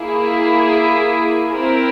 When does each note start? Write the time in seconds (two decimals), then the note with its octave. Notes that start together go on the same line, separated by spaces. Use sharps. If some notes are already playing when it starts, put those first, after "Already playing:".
Already playing: A#3 E4 G#4 E5
1.53 C4 E4 A#4